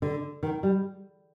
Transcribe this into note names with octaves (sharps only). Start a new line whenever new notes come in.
D3
D#3
G3